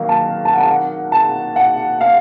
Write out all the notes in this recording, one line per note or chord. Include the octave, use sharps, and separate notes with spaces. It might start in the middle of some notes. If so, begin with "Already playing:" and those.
Already playing: D#3 F#3 A#3 A#4 F5
A5
A5
F#5
A5
F#5
A5
F#5
F5